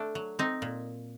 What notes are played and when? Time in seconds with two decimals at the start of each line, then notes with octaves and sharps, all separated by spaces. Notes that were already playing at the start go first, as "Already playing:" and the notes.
Already playing: A3 D4
0.15 F#3
0.39 C4 D#4
0.62 A#2